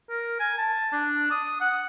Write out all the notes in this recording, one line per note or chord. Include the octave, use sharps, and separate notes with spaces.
A#4
G#5
A5
D4
D#6
F#5